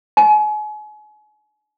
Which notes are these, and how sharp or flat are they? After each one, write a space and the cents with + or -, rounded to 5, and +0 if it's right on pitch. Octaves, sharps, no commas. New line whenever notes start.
G#5 +35